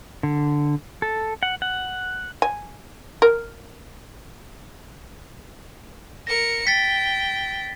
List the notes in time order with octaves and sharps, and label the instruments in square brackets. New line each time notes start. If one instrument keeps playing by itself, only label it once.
[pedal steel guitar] D3
A4
F#5
F#5
[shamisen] G#5
A#4
[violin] A#4 C#7 [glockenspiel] A#6
[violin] G5 [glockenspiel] A6 B6